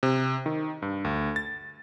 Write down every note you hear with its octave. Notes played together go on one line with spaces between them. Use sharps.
C3
D#3
G2
D2
A6